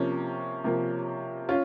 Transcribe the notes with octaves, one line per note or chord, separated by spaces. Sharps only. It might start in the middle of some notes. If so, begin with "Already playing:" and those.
Already playing: C3 F3 A#3 C#4
C3 F3 A#3
C#4 F4